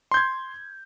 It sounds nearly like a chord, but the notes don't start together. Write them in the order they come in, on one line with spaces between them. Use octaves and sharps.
C6 G6 G#6